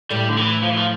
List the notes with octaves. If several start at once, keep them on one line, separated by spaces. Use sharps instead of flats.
A2 G3 A3
D3
E3
F3
E3
F3